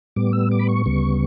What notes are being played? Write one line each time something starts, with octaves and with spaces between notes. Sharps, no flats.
A2 G3 B3 D6
E6
D6
B5
C#6
D2 C#3 G3 B3